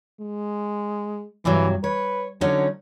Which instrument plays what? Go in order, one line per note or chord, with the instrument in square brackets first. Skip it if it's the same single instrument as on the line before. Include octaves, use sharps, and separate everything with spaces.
[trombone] G#3
[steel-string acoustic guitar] G2 C3 F#3 [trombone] E3
[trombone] B4 [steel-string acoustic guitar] C#5
[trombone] D3 [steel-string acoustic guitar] F#3 C#4 D#4